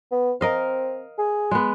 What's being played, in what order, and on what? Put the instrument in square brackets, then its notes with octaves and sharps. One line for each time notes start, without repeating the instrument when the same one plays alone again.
[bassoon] B3
[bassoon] C4 [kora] A#4 D#5 F5
[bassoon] G#4
[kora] G#3 B3